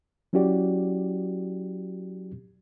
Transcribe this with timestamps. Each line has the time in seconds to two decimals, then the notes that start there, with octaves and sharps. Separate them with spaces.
0.33 F#3 C#4 E4 F#4 G4 D5